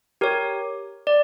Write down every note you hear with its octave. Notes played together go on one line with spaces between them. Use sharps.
G4 A#4 C#5
D5